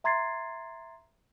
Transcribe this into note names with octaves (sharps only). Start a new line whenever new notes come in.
E5 A#5 C6 G#6 A6 C7